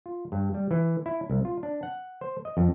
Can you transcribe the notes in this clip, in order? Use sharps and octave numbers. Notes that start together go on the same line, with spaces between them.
F4
G2
G3
E3
E4
C2
F4
D4
F#5
C5
D#5
F2